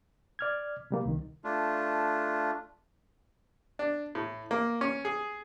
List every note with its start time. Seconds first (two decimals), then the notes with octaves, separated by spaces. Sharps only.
0.39 D5 F6 G#6
0.91 C3 G3 A#3
1.05 C2 D#3
1.44 A3 D4 F4
3.79 D4
4.15 A2
4.51 A#3
4.81 C#4
5.05 G#4